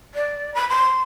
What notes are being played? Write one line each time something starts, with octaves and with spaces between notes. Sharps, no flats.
D5
B5
C6